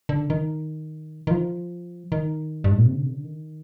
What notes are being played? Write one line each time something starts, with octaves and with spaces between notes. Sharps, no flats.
D3
D#3
D#3
F3
D#3
G2
G#2
A#2
C3
D3
C3
D3
D#3